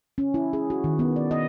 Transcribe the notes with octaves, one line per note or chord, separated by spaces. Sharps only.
C#4
E4
G#4
F#4
D#3
B3
D5
D#5